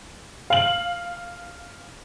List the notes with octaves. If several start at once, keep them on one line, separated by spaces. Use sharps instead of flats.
F5 F#7